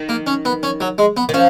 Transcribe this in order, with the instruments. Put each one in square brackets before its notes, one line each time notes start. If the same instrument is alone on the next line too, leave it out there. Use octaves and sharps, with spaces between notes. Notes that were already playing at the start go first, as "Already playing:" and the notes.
Already playing: [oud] D#3
[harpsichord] A#3
C#4
B3
C#4
F#3
G#3
B3
[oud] D#3
[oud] F3 [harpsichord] C#4